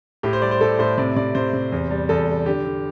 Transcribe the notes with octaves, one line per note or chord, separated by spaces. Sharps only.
A2 G4
C5
G3 D5
C5
A2 A4
A2 C5
C3 D5
C3 D5
C3 C5
C3
E2
G3
E2 A4
G3
D3 G4
D3